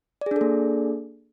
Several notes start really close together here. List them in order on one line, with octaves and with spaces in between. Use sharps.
D5 G#4 D4 A4 A#3